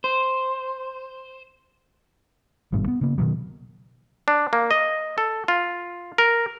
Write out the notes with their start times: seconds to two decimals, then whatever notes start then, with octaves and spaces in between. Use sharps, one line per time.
0.04 C5
2.72 G#1 G2 B2
2.88 B3
3.01 C#3 A#3
3.18 B2 D#3 F#3
4.28 D4
4.53 A#3
4.71 D#5
5.18 A4
5.48 F4
6.18 A#4